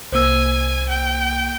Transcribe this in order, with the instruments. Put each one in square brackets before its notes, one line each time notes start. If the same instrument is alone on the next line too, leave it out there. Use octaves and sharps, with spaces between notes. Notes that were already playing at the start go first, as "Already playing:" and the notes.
[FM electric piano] C2 A#3 [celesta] C5 E6 [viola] G#5
[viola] G5